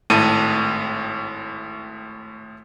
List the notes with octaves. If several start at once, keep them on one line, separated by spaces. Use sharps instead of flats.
G#1 A2 A4 D#7